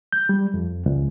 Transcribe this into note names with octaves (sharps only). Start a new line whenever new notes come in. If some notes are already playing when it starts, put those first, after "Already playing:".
G6
G3
F2
C#2